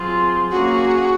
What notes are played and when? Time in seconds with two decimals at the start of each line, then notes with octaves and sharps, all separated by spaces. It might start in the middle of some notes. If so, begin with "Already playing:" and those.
Already playing: F#3 C4 F4 G#4
0.50 A#3 C#4 F#4 G#4